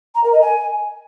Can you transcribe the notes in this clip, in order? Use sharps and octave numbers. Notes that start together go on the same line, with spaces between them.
A#5
A#4
D#5
G#5